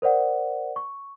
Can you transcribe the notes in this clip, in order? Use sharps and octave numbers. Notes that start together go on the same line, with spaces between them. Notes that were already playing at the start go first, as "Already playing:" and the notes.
A#4 C5 D5 F#5
C#6